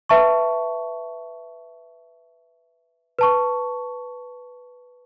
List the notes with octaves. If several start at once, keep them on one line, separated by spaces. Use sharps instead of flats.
B4 E5 A5 C#6
B4 A5 C#6